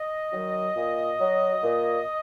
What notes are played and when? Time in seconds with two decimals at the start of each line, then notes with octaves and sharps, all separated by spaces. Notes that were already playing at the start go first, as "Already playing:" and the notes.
Already playing: D#5
0.32 D#3 F#3
0.76 A#2
1.20 F#3
1.63 A#2